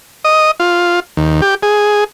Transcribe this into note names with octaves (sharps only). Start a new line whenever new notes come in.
D#5
F4
D#2
G4
G#4